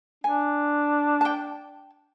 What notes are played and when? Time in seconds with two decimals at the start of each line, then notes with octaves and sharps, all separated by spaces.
0.24 D4 G#5
1.21 G5 A5